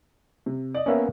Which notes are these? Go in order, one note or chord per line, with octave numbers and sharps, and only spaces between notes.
C3
D5 D#5
A#3 B3 C#4 A#4 C#5 E5